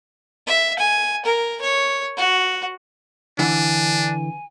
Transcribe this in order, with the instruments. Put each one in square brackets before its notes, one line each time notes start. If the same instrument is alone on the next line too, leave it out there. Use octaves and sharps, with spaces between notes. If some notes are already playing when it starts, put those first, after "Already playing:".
[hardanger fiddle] E5
G#5
A#4
C#5
F#4
[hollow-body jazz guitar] D3 E3 [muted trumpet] D4 [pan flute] G#5